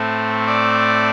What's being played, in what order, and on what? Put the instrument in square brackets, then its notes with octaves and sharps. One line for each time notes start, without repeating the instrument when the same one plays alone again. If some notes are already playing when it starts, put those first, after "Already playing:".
Already playing: [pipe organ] A2 A3 C4
D5